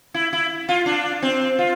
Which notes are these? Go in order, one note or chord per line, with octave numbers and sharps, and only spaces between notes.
E4
E4
F4
D4
C4
F4